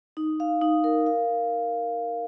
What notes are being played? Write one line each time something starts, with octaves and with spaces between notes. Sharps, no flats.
D#4
F5
D#4
A#4
F5